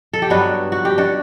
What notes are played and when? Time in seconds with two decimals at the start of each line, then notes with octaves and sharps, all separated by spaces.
0.13 A4
0.22 G4
0.30 G2 F#3 B3 D4 F#4
0.72 F#4
0.85 G4
0.98 D4 F#4